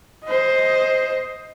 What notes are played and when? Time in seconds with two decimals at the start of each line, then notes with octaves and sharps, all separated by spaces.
0.25 C5 D#5